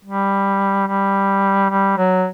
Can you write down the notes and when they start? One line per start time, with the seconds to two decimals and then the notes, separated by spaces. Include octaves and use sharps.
0.05 G3
0.88 G3
1.71 G3
1.97 F#3